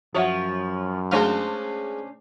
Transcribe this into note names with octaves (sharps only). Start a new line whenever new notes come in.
F#2 F3 F#4 C#5 E5 F#5
G#3 A3 C#4 D4 C5 F5